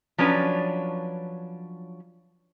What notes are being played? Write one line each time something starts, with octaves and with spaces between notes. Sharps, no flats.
F3 F#3 C#4 D4 B4